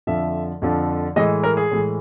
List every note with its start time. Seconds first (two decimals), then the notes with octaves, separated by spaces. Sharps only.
0.07 F2 D3 F3 E5
0.62 F2 D3 F3
1.16 A2 E3 G#3 D#5
1.43 A#4
1.57 G#4
1.71 A2 E3 G#3